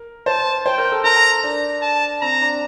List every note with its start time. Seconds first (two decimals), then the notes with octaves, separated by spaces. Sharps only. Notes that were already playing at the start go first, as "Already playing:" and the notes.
Already playing: A#4
0.26 C5 A5
0.66 C5 G5
0.78 A#4
0.92 A4
1.04 A#4 A#5
1.44 D4
1.82 A5
2.22 C4 A#5
2.41 D4